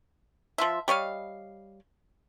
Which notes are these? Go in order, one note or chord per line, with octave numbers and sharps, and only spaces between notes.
F3 F4 E5
G3 C#5 D#5 F5